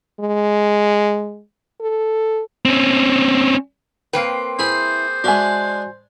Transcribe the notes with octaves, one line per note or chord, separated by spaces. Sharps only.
G#3
A4
C4 C#4
A#3 C4 B4 G5
E4 G#4 C5 B5
G#3 D4 F#4 E5 G#5